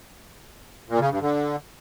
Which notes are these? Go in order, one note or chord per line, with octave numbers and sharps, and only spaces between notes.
A#2
C#3
G2
D3